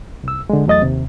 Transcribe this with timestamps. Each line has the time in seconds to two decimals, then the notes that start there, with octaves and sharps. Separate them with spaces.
0.24 C2 E6
0.50 D3 G#3
0.67 E2 F#3 A3 D#5 D#6 A6
0.82 D#2 C3